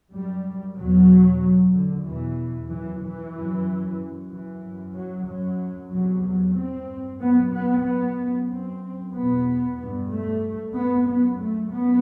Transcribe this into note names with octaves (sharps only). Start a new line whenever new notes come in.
F#2 G3
E2 B2 F#3
F#2
D3
E2 B2 E3
F#2 E3
E3
F#2
F#2
E3
F#2
F#3
F#2 F#3
E2 C3 F#3
F#3
G2 C4
F#2 B3
B3
F#2 B3
F#2 C4
E2 B2 B3
G2
A3
G2
B3
F#2 B3
A3
F#2 B3